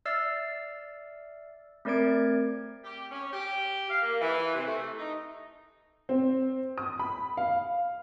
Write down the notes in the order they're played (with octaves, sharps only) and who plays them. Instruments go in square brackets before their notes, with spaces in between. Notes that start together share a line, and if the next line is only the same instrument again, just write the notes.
[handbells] D5 E5 E6 F6 A6 C7
A3 C4 A#4 D5 G#6 D7
[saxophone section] G4
C#4
G4
F5
A#3
E3
C3
A3
D#4
[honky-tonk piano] C4
D#6
B5
F5